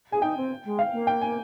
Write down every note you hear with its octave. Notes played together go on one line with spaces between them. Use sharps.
G#4 G#5
D#4 G5
C4
G#3
F5
A#3
G5
G#5